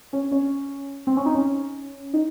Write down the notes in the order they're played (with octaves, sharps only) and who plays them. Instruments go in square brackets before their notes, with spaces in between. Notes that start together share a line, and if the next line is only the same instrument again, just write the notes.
[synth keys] C#4
C#4
C4
C#4
D#4
C#4
D#4